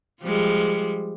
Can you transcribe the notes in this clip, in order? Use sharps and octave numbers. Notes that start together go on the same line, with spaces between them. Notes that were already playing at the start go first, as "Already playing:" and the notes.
F3 G3 G#3